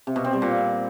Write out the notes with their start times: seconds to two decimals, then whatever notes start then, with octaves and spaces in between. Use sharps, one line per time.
0.07 C3
0.16 B2
0.24 C4
0.33 G3
0.42 A#2